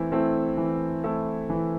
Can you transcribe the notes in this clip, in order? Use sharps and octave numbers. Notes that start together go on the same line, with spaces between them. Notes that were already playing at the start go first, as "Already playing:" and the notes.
Already playing: E3 A3 C4 E4
A3 C4 E4 A4
E3
A3 C4 E4 A4
E3